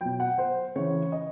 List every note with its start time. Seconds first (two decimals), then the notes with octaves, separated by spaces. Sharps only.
0.01 B2 F#3 G5
0.20 F#5
0.38 C5
0.76 C#3 E3 C#5
1.12 D#5